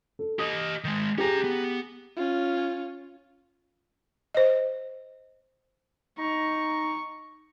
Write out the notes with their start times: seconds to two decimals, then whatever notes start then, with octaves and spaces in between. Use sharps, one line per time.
0.19 A4
0.39 G4 D#5 D#6
0.84 D#3 G#3
1.18 C#4 G4 G#4 A#5
1.44 B3
2.17 C#4 F4
4.35 C5 D#5
6.19 D#4 A#5 C#6